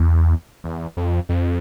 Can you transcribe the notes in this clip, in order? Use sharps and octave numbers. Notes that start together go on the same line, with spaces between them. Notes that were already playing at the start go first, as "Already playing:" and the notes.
Already playing: E2
E2
F2
F2